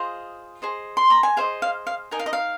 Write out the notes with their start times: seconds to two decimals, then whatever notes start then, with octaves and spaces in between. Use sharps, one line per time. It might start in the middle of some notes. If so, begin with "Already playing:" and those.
Already playing: F4 G#4 C5 D#5
0.62 G#4 C5 D#5
0.97 C6
1.10 A#5
1.23 G#5
1.37 G#4 C5 D#5 F5
1.62 F5
1.87 F5
2.11 D#4 A#4 D#5 G#5
2.19 F5
2.26 D#5
2.33 F5